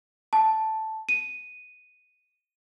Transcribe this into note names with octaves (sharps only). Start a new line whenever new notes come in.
A5
D#7